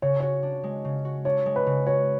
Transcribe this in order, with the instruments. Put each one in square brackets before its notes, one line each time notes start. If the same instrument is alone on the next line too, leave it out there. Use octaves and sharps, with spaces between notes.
[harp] C#3 [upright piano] C#5
[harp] F#4 [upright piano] C#5
[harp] D4
G#3
C#3
F#4
[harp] D4 [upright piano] C#5
[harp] G#3
[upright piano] B4
[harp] C#3
[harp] F#4 [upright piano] C#5